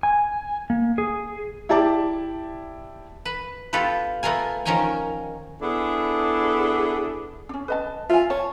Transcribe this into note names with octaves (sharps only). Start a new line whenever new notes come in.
G#5
A#3
G#4
E4 G4 D5 A5 D6
B4
B3 F4 G4 A4 B4
A3 B3 F4 A#4 G#5
D#3 F3 C#4 A#4 G5 G#5
B3 D4 E4 G#4 A4
C#4 D4
B4 D#5 A5
F4 E5 G#5
C#5 A5